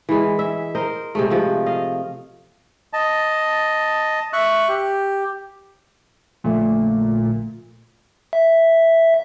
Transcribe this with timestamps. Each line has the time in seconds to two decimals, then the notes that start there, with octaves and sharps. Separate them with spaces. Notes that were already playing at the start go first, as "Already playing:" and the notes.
0.09 E3 G#3
0.39 E5
0.75 A#4 C5 D#5
1.15 C3 G#3 A3
1.30 C3 F3
1.66 D#5 F5
2.93 D#5 A5
4.33 E5 C#6 F#6
4.68 G4
6.44 A#1 A#2 D3 A3
8.33 E5